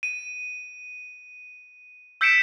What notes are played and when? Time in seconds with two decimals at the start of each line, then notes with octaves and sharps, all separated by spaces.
0.03 D#7
2.21 E6 G6 B6 C#7 D7 E7